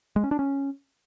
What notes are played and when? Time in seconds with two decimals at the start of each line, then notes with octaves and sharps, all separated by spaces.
0.16 G#3
0.24 C#4
0.31 D4
0.39 C#4